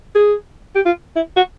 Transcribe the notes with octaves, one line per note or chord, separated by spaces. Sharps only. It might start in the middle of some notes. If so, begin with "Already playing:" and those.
G#4
G4
F4
E4
F#4